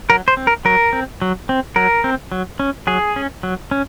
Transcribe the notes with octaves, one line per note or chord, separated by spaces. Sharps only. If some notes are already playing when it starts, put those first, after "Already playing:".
F#3 A#4
C5
C4
A#4
F#3 A#4
C4
F#3
C4
F#3 A#4
C4
F#3
C#4
F#3 G#4
C#4
F#3
C#4